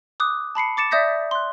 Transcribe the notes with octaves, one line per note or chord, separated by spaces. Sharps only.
D6 D#6 F#6
A5 B5 C7 C#7
D6 A6 C#7 E7
D5 E5 D#6 G6 A#6 B6
C6 F#6